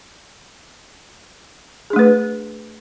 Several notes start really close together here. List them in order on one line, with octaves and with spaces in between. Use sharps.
G#4 D4 A3 B4